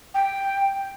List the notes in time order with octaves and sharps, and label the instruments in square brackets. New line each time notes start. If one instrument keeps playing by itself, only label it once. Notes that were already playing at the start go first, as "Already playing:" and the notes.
[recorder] G5